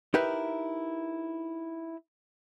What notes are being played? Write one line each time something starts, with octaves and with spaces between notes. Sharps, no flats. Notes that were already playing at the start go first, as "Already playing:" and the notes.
D#4 E4 G4 A#4 B4 E5